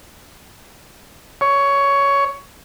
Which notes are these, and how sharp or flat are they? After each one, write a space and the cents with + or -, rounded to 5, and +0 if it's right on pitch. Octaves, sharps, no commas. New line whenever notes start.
C#5 +15